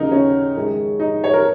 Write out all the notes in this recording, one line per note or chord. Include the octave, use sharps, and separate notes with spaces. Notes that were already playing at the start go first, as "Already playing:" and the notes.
Already playing: D#2 C#3 F#3 D#4 A#4
C#4
F#2 D#3 G#3
D#4
C#5
A#4